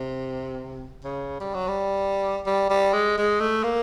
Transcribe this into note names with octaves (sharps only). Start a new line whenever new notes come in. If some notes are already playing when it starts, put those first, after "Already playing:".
Already playing: C3
C#3
G3
F#3
G3
G3
G3
G#3
G#3
A3
A#3